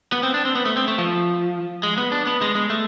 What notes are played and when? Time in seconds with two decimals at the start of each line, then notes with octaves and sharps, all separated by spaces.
0.12 B3
0.23 C4
0.34 D4
0.45 C4
0.55 B3
0.65 A3
0.77 C4
0.88 A3
0.98 F3
1.83 G#3
1.98 B3
2.12 D4
2.27 B3
2.42 G#3
2.55 G#3
2.70 A3